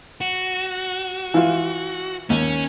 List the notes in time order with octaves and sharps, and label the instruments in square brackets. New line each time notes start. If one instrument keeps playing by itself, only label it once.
[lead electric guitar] F#4
[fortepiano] E3 F4
[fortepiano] D#2 [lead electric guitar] C#4